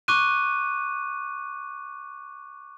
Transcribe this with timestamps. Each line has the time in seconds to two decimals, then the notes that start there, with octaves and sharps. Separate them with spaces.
0.08 C#6 D6 F#6 D#7